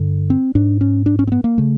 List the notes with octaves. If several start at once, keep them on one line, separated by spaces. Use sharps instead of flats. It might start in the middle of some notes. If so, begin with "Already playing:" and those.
Already playing: G2 D3
C4
G#2 D4
C#4
D4
C#4
C4
B3
A#3
C#3 A3